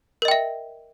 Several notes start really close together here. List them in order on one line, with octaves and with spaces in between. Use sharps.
A#4 D#5 G5 E5